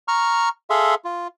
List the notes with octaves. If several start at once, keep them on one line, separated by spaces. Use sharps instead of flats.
A#5 C#6 F6
G#4 A4 E5 F5 C6
F4